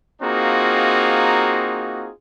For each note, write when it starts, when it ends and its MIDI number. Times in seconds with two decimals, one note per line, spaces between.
0.22 2.10 58
0.22 2.10 60
0.22 2.10 63
0.22 2.10 65
0.22 2.10 66
0.22 2.10 68